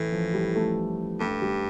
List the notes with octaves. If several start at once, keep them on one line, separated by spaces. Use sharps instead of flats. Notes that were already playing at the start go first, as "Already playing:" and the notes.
Already playing: A2 E3
F3
G3
A3
G2 A3
G3